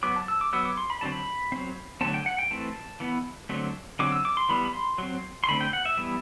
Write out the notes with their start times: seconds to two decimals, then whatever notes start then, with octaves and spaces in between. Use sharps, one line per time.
0.03 F#3 B3 D6
0.16 A5
0.28 E6
0.41 D6
0.53 F#3 B3 E6
0.65 D6
0.77 C6
0.90 B5
1.01 D3 F#3 A3 C4 A5
1.12 B5
1.52 F#3 C4
2.01 D3 F#3 A3 C4 A5
2.14 G5
2.26 F#5
2.38 G5
2.51 E3 A3 C4 A5
3.00 E3 B3
3.49 D3 F#3 A3 C4
3.99 D3 F#3 C4 D6
4.12 E6
4.25 D6
4.37 C6
4.49 E3 G3 B3 B5
4.65 B5
4.74 C6
4.98 F#3 C4
5.44 C6
5.48 D3 A3 C4 B5
5.61 G5
5.73 F#5
5.85 E5
5.97 E3 G3 B3